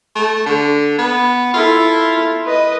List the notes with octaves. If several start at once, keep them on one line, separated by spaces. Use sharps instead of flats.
A3
D3
B3
E4 F4 A4
B4 D#5